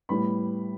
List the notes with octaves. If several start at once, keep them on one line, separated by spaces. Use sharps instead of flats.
A2 G3 B3 B5